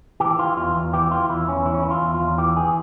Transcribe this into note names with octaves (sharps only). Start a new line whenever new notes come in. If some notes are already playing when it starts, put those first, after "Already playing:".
E3 G4
E3 F4
E2 F4
E2
E3 G4
E3 F4
E2 E4
E2 C#4
E3 E4
C#4
E3 E4
F4
E2
F4
E2
E3 G4
E3 G#4